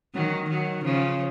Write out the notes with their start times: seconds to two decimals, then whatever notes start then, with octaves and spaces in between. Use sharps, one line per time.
0.15 D#3 F#3
0.50 D#3 F#3
0.84 C#3 F3